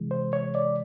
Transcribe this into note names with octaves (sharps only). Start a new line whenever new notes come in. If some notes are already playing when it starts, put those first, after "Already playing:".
Already playing: C3 E3 G#3
C5
C#5
D5